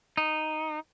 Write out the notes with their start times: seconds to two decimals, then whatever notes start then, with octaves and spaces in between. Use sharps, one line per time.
0.17 D#4